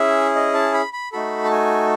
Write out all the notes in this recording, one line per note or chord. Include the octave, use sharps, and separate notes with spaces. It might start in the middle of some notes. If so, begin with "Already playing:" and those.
Already playing: C#4 E4 G#4 E5
D#5
A5
B5
B5
A3 D#4 F#4 A4 B5
A5
G#5